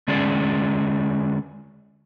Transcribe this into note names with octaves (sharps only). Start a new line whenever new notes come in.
D3 G#3 C#4 G#4 D5